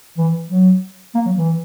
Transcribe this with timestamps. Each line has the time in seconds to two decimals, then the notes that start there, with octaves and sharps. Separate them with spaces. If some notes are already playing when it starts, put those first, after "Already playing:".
0.18 E3
0.50 F#3
1.15 A#3
1.26 F#3
1.37 E3